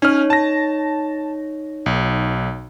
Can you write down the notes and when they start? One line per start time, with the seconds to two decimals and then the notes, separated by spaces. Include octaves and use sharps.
0.02 C#4 D#4 C#5 F6
0.30 A5 A#6
1.86 B1